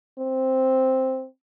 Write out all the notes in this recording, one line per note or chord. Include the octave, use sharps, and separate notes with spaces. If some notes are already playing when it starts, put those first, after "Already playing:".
C4